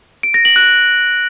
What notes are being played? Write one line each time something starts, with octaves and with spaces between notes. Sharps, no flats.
D7
A#6
F#7
F#6